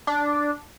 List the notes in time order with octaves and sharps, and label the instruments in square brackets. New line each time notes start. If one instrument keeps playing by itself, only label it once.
[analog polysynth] D4